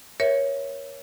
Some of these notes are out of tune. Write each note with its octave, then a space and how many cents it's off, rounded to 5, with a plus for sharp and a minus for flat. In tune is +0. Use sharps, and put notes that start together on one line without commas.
A#4 +25 C#5 +0 E5 +0